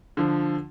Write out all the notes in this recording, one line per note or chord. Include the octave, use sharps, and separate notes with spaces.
D3 F3